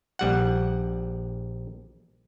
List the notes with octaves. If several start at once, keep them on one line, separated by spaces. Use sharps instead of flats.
A#1 G3 F#5